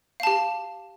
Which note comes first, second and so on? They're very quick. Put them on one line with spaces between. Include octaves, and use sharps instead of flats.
F5 A5 G4